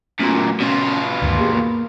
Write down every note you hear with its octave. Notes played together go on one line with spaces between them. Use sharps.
F#2 A#2 A3 B3 F#4
B2 C#4 F4
D2 G2 D#3
A#3 G4 G#4
A#3